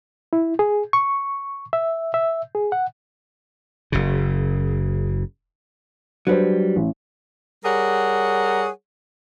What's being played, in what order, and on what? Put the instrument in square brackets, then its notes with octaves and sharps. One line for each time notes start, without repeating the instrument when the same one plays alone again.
[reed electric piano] E4
G#4
C#6
E5
E5
G#4
F#5
[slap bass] F#1 C#3
[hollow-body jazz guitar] F#3 G3 [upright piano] D4 B4 C5
[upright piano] A1
[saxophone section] G3 G#4 A#4 C#5 F#5